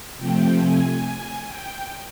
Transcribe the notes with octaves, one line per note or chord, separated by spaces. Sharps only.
C3 F3 A3 C4 G5
G#5
G5